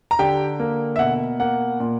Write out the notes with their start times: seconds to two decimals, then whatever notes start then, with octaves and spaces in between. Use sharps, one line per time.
0.11 A#5
0.19 D3 G4 G5
0.60 A#3
0.96 E5
0.99 B2 F#5
1.40 A#3 F#5
1.80 A#2